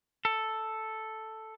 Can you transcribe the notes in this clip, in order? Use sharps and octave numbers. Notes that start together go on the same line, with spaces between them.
A4